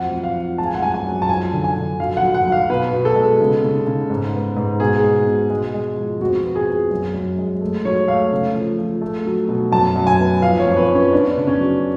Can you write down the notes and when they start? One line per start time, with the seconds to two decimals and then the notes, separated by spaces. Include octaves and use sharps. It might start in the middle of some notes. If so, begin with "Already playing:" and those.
Already playing: F2 F#3 F#5
0.12 F2
0.23 F5
0.36 F3
0.58 G#3 A5
0.66 G#5
0.74 F#5
0.82 F#2 G#5
0.94 G#5
1.06 F#2
1.22 A5
1.29 F3 G#5
1.53 D3
1.64 G#5
1.76 D3
2.00 F#3 F5
2.17 F#5
2.23 F#3
2.34 F#5
2.47 F#3
2.52 F5
2.70 B2 B4
2.93 B2
3.05 A4
3.16 G#3
3.40 C#3
3.63 C#3
3.87 C#3
4.10 G#2
4.34 B3
4.56 G#2
4.80 B2 G#4
5.04 G#3
5.27 B2
5.50 G#3
5.74 G#3
5.97 F3
6.20 F2 F#4
6.44 B3
6.55 G#4
6.67 F3
6.91 F#2
7.14 F#2
7.38 G#3
7.61 A3
7.85 F#3 C#5
8.07 A3 F5
8.32 C#3
8.55 F3
8.79 F3
9.01 A3
9.26 F#3
9.49 B2
9.72 F#2 A5
9.96 F#2
10.07 G#5
10.19 B3
10.42 F3 F5
10.60 C#5
10.66 F2
10.77 B4
10.89 F3
10.95 C#4
11.12 B3 D4
11.36 C#3
11.47 C#4
11.59 F#3